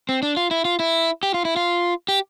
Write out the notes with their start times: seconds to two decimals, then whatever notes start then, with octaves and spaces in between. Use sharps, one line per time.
0.09 C4
0.23 D4
0.37 F4
0.51 E4
0.65 F4
0.80 E4
1.23 G4
1.34 F4
1.45 E4
1.56 F4
2.08 G4